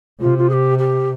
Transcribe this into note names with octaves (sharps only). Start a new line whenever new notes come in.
C3 F4
F4
G#4
G4
G4